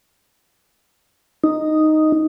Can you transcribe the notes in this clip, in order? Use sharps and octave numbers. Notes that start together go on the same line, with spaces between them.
D#4